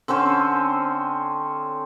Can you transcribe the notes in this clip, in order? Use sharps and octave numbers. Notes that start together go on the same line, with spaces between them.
D3 C4 C#4 C5